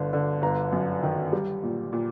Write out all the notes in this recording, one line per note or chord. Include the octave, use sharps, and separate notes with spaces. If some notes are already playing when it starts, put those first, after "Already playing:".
Already playing: G1 D3
D3
G1 A#5
F#2
D#3
G3
A#2
A#2